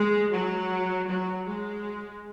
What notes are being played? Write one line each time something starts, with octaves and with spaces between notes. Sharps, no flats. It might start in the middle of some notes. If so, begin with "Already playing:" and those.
Already playing: G#3
F#3
F#3
G#3